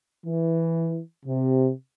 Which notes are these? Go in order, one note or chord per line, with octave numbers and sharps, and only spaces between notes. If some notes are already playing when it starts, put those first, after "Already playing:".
E3
C3